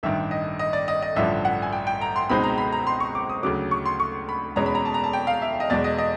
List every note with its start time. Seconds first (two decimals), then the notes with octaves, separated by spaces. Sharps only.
0.03 A1 G2 D#3 E5
0.31 D#5
0.59 D#5
0.73 D5
0.88 D#5
1.02 D#5
1.16 A1 G2 D3 F3 E5
1.45 F#5
1.62 G#5
1.72 G5
1.87 G5
2.01 A#5
2.16 C6
2.30 C#2 B2 G#3 C4 D#4 B5
2.43 A#5
2.58 B5
2.72 A#5
2.87 C6
3.00 C#6
3.15 D6
3.29 D#6
3.43 D2 C#3 F#3 D6
3.71 C#6
3.86 C6
4.00 C#6
4.29 B5
4.56 E2 B2 G#3 C#4 A#5
4.66 B5
4.75 A#5
4.85 A5
4.94 A#5
5.04 A5
5.13 G5
5.27 F5
5.42 E5
5.60 D#5
5.70 E2 B2 G#3 D5
5.84 D#5
5.98 D#5